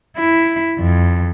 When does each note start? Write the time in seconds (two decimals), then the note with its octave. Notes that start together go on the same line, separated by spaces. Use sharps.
0.17 E4
0.79 F2